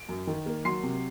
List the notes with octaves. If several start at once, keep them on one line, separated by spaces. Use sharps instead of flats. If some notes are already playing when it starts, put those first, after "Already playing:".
Already playing: D7
F#2
D#3
A#3
F#3 C6 C7
C3